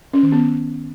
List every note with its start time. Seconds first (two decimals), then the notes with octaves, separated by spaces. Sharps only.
0.13 C#4
0.23 D#3
0.32 B3